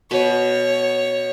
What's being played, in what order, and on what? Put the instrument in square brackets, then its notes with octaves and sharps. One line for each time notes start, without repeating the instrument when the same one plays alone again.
[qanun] B2 B4 [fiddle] C#5